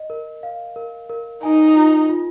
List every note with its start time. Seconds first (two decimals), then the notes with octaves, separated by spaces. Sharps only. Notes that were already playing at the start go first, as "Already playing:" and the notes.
Already playing: D#5
0.10 A#4
0.43 F5
0.76 A#4
1.10 A#4
1.43 D#4 G#5
1.76 F4
2.09 F4